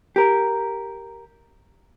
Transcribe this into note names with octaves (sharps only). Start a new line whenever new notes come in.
G4 A#4